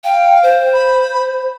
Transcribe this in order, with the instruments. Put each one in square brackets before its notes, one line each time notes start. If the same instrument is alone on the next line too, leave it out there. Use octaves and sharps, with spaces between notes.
[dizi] F5 [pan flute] G5
[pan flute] C5
[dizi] B5